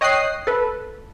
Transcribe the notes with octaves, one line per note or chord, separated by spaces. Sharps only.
C#5 D#5 G5 D#6 F#6 C7
A4 B4